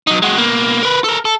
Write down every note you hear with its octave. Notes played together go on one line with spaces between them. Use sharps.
F#3 D#4
G#3 F#4
B2 A#3
A#4 B4
A4 A#4
A4